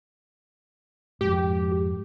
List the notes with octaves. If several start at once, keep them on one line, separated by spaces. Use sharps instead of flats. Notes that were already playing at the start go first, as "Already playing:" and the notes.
F2 G#2 G4